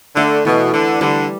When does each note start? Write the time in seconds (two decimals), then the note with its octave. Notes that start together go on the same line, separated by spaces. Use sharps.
0.16 D3 A3
0.45 B2 E3
0.74 D3 D5
1.01 D3 G3